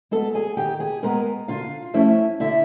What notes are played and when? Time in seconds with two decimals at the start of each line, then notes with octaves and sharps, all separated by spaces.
0.11 G#3 B3 A4 A5
0.35 G#4 G#5
0.57 D#3 G4 G5
0.80 G#4 G#5
1.03 G#3 B3 A#4 A#5
1.48 D3 F4 F5
1.94 F3 A3 C#4 E4 E5
2.40 D3 E4 E5